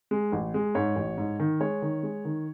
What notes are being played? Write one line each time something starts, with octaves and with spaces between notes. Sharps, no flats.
G#3
A1
G#3
G#2 C#5
A1
G#2
D#3
G#3 C#5
D#3
G#3
D#3